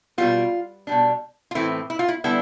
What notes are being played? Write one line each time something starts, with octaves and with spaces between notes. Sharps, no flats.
B2 G3 B3 F4
B2 G3 D4
F4
A2 E3 A3 C4 E4
E4
F4
E4
D3 G3 B3 D4 E4